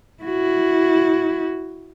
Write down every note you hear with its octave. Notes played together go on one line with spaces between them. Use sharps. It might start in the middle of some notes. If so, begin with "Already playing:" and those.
E4 F#4